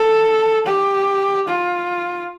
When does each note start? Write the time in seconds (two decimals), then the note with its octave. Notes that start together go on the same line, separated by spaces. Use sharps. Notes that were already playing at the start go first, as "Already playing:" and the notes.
Already playing: A4
0.66 G4
1.48 F4